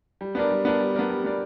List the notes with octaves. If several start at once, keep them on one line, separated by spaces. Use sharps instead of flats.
G3
B3 D4 A#4 D5
G3
B3 D4 A#4 D5
G3
B3 D4 A#4 D5
G3
B3 D4 A#4 D5